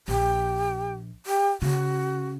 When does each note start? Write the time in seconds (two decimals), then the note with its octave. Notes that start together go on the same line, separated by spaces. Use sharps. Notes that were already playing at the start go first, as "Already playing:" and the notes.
0.08 A#1 G4
1.26 G4
1.62 C#3 F#4